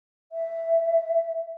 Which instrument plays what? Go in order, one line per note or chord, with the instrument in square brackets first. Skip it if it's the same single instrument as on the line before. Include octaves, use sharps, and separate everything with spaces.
[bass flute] E5